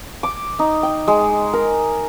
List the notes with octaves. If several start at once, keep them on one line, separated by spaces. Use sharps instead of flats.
D6
D#4
G5
G#3
A#4